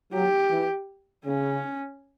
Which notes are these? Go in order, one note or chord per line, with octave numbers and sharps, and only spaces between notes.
F#3 G4
E3
C#3 C#4